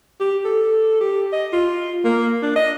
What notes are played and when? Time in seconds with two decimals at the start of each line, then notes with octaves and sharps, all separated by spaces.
0.20 G4
0.44 A4
1.00 G4
1.32 D#5
1.53 F4
2.05 A#3
2.42 D4
2.56 D#5